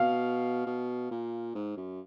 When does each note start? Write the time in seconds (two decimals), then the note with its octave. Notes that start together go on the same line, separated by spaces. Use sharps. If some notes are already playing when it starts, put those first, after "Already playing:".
Already playing: B2 F5
0.66 B2
1.11 A#2
1.55 G#2
1.77 F#2